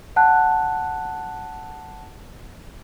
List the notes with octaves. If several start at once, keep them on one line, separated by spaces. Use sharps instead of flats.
F#5 A5 F#6